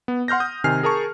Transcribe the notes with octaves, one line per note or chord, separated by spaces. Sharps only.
B3
F#5 C6 F6 G6 A#6
D#6 G6
C3 D#3 G#5 F6 C7
G#4 A#4 A5 C#6